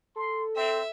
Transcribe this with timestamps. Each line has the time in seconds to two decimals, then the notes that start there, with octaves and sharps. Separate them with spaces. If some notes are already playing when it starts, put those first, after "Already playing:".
0.16 A4 C6
0.56 C4 E5